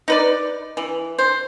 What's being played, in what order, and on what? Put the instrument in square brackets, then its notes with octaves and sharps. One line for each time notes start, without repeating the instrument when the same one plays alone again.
[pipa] D#4 B4 D5
E3
C5